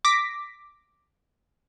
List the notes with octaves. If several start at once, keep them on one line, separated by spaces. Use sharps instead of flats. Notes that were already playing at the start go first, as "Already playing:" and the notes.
D6 A#6 B6